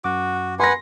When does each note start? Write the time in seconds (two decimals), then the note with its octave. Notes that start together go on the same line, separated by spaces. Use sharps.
0.04 F#2 F#4 D6
0.60 B4 F#5 G#5 C6 A#6